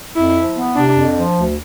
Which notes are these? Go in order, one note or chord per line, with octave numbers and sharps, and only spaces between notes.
F2 E4
F3
B3
C3 D4
F2
F3
D2